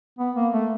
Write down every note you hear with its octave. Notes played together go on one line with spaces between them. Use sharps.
B3
A#3
A3